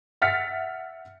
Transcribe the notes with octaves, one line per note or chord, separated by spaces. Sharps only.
E5 F#5 F6 A6 B6 C#7